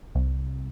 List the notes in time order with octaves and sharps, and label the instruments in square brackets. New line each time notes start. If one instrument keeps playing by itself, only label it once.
[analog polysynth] C2